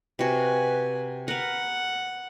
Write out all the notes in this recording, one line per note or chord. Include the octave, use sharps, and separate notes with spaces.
C3 F#4 B4 G#5
A#4 B4 F#5